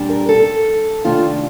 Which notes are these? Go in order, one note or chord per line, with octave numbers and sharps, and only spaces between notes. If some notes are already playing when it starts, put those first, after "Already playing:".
Already playing: A#2 G3 D4
A#4
A4
C3 D#3 A3 D4 F4